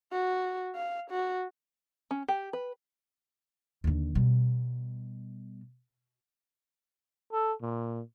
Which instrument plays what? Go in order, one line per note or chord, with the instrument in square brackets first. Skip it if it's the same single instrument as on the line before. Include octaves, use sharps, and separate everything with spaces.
[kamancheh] F#4
F5
F#4
[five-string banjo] C#4
G4
B4
[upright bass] D#2 D3
B2 G3
[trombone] A4
A#2